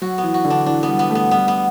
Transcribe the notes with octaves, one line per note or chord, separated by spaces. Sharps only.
F#3 F#4
B3
E3
F#4
D3
D4
E3 D4
B3
G3
B3
A3
B3
G3 B3
B3